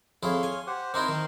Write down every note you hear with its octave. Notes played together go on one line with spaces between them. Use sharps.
F2 E4 G#4 C#5 F5 C6
G#5
G4 C5 F#5
C4 D#4 E4 A#4 C5 C6
D#3